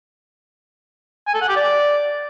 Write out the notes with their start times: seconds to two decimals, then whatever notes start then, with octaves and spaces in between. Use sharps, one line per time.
1.27 G#5
1.34 A4
1.42 F#5
1.49 G4
1.56 D5